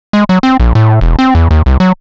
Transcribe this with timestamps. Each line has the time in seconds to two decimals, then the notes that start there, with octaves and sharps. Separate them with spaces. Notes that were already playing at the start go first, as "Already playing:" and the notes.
0.13 G#3
0.29 F#3
0.43 C4
0.60 A#1
0.75 A2
1.01 E1
1.19 C4
1.35 E2
1.51 D#2
1.66 C2
1.80 F#3